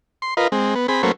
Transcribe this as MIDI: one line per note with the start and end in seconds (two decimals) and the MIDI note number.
0.22 0.34 84
0.37 0.47 65
0.37 0.47 70
0.37 0.47 71
0.37 0.47 75
0.52 0.75 56
0.52 0.75 60
0.75 0.87 59
0.88 1.02 60
0.88 1.02 68
0.88 1.02 83
1.03 1.12 54
1.03 1.12 57
1.03 1.12 58
1.03 1.12 61
1.03 1.12 71
1.03 1.12 72